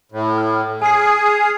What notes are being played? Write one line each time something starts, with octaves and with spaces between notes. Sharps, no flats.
A2
F6
G#4 G#5 F6 C7
F6 F7